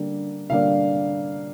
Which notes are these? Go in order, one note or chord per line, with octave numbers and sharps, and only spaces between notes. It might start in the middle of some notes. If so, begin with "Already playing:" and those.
Already playing: D3 G3 A#3 D4
D3 G3 A#3 D4 F5